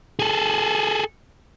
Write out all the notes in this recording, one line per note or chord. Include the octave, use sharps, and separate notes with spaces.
G#4 A4